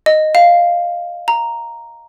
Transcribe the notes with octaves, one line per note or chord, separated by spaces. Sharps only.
D#5
F5
A#5